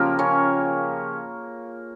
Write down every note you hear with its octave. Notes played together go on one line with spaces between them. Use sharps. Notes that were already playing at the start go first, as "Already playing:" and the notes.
Already playing: C#3 F3 A#3 F4 G4 A#4 F5
C#4 C#5